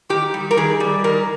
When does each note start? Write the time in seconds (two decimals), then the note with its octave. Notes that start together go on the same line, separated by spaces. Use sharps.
0.09 D#3 G4
0.34 G3
0.51 A#4
0.57 D#3 G#4
0.80 G3
1.04 D#3 A#4